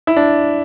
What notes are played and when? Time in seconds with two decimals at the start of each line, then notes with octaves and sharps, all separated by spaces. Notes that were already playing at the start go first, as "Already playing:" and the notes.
0.07 E4
0.16 D4